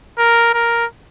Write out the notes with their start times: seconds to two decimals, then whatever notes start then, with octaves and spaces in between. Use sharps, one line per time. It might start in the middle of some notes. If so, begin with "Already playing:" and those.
0.18 A#4
0.53 A#4